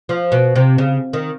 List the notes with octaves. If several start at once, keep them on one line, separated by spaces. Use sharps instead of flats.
F3
B2
C3
C#3
D#3